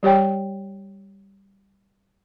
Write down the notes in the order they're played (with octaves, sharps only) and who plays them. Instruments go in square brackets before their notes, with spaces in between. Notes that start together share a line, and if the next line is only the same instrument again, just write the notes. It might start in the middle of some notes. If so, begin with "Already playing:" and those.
[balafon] G3 G4 C#5 G5